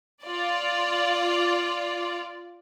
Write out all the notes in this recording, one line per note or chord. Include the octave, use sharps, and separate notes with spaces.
F4 D5